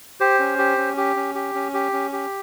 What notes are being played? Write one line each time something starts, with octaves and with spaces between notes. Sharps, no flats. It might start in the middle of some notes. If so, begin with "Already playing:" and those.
G4 C5
C#4
G4
C#4
G4
C#4
G4
C#4
G4
C#4
G4